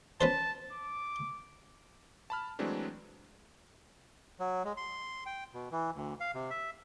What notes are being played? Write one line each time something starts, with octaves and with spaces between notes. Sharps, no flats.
C#4 B4 C5 A5
D6
A5 B5 F6
E3 F#3 G#3 A3 C4 D4
F#3
G#3
C6
G5
B2
E3
D2
F5
C3
E5